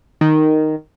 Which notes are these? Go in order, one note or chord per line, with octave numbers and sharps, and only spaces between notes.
D#3